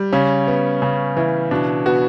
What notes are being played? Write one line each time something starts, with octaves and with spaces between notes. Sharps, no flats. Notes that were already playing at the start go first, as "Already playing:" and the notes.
Already playing: G3
C#3 C#4
B3
C#3
E3
B2 D4
B3 F#4